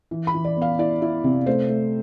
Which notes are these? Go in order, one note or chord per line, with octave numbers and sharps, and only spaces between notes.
E3
B5
E3
D5
B3
F5
E4 D5
E4
C3
A3 C5
A3